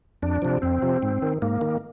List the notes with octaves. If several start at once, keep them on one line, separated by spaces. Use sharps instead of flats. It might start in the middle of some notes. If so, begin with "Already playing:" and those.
F2 D4
C3 F3
F2 C4
C3 F3
G#2
D#3
G#2 A#3
D#3